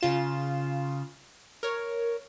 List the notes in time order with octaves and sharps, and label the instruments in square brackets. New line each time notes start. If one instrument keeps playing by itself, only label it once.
[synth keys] C#3 F4 E7
A#4 C#5